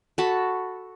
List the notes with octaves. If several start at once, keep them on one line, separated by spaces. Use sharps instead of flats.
F#4 A4 A5 B5